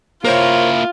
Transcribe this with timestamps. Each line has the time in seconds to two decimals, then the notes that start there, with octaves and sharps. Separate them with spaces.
0.24 A#3 E4 F4 A#4 C5 C#5